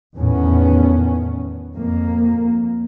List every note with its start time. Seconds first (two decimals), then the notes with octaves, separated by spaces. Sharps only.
0.16 E2 A2 D#3 B3 C#4
1.74 F2 A#3